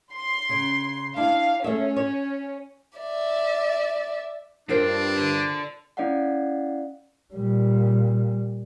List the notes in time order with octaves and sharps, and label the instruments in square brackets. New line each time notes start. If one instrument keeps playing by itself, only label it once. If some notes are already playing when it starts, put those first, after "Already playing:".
[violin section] C6
[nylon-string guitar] C#3
[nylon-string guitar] D4 E4 [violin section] F5
[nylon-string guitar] A3 G#4 E5 [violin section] C#4
[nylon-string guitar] C#5
[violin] D5 E5
[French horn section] G2 [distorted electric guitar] C4 G5 [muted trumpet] D4 [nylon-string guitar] F4 A#4 C5
[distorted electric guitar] D3
[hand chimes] C#4 E4 D5 D#5 F5 F#5
[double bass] A#2 G3